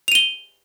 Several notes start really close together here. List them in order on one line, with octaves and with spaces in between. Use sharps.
F7 D#7 G7